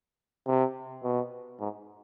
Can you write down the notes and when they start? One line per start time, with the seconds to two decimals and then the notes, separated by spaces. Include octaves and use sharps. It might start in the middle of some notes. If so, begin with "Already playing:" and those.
0.47 C3
1.03 B2
1.60 G#2